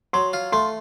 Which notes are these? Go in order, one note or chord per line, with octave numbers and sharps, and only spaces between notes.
F#3 C6
F4
A3 C6